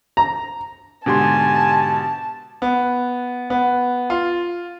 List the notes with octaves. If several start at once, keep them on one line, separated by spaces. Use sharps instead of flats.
A#5
G#2 B2 D3 G4 G#5 A5 C6
B3
B3
F4